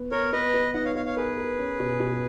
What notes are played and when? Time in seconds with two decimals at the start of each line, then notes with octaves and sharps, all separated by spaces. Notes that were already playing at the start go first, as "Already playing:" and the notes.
Already playing: B3
0.11 B3 A#4 C#5
0.32 B3 B4 D#5
0.54 B3
0.74 D#4 D#5 F#5
0.85 C#5 F5
0.95 B3 C#5 F5
1.06 C#5 F5
1.16 G#4 A#4 B4
1.38 A#4
1.59 C#4
1.80 B2
2.00 B2